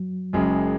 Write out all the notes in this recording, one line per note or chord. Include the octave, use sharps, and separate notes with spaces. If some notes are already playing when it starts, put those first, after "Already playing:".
Already playing: F#3
F#1 F#2 C#3 G#3